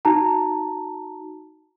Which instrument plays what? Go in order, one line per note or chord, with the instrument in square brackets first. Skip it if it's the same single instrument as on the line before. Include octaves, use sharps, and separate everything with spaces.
[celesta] D#4 F#4 A5 A#5